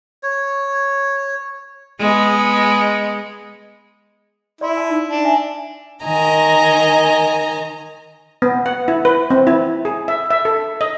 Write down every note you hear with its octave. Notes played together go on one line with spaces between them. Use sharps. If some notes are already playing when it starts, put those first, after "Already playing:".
C#5
G#3 B3
E4 D5 C6
A5
D#4
D4
E5 G#5
D#3 D#5 G#5 A#5
B3
F#5
E4
B4
C4
E4
G#4
E5
E5
A4
D#5